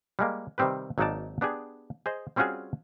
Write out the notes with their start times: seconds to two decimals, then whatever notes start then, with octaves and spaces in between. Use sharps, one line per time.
0.19 G3 G#3 A#3
0.58 C3 D#3 G3 C4 G4 B4
0.98 G#1 F#3 A#3 D#4 D5 A5
1.41 B3 D4 G4 G#4
2.06 G#4 C5 D#5
2.36 G3 C4 C#4 F4 F#4 G#4